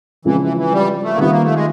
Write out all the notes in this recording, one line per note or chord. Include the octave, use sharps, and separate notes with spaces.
C#3 E3 F3 G#3 C4
E3
E3
G3
A3
A#3
D#3 G3 B3 C4 F4
A#3
A3
G#3